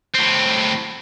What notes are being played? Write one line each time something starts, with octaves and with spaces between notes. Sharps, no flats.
A2 C4